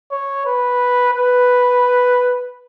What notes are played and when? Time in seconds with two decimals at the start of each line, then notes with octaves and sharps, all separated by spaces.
0.12 C#5
0.46 B4
1.13 B4